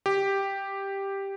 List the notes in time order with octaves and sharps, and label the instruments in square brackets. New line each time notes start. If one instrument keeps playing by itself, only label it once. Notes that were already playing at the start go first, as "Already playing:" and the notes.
[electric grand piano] G4